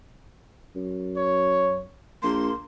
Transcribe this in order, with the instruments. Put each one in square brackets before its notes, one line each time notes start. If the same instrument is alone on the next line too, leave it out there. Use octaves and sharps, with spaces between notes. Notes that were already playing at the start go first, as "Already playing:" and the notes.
[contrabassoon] F#2
[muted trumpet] C#5
[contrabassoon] A#1 [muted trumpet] A#3 [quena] C6